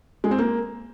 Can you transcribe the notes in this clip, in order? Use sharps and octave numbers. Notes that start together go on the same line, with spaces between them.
G#3
C4
A#3